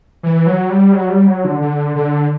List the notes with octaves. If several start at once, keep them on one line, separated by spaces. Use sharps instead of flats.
E3
F#3
G3
F#3
G3
F#3
D3
D3
D3